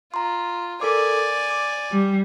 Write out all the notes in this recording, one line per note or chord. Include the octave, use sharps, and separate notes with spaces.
F4 A#5 C6
A4 A#4 D5 G#5 D6
D6
D6
G3